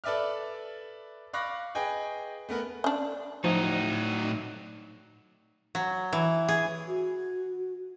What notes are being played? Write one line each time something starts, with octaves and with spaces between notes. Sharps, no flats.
A4 B4 D5 E5 D6 F6
F5 B5 C#6 D6 F#6 A#6
G#4 B4 D#5 G5 G#5
A3 B3 A#4 B4
C#4 D4
A2 F3 F#3 D#4
F#3
E3
G#4
F#4